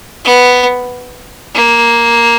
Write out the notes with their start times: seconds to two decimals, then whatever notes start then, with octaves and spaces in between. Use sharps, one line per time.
0.25 B3
1.55 A#3